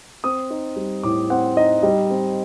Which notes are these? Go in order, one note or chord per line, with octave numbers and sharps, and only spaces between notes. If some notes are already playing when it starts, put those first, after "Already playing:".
C4 D#6
D#4
G3
A2 D6
C4 F#5
D#4 D#5
G3 D#5
C4